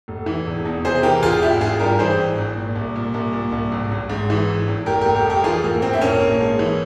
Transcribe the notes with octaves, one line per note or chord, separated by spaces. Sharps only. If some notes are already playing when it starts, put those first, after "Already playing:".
F1
E3
E1
E2
C3 G#4 C5
E3 G4 A#4
E1 F4 G#4
G#1 E4 G4
G#1 F4 G#4
G2 G4 A#4
E3 G#4 C5
G#1
G#1
A#2
C2
A#2
C2
A#2
C2
G#1
G#1
G#2
E3
G#1
G#1
F1 G4 A#4
F1 G4 A#4
G4 A#4
F2
G4 A#4
E3 F4 G#4
F1 A#3
F1 C4
E4
A#1 A#3 C#4
A#1
G#2
E3